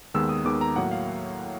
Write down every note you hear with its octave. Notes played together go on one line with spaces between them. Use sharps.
D#2 D#3 G#3 B3 E6
D#6
D#2 D#3 G#3 B3 D6
A#5
A2 F#3 A#3 F#5
F5